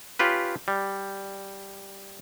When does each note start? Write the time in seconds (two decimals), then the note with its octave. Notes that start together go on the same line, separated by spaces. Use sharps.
0.19 C#4 F4 G4 B4
0.68 G3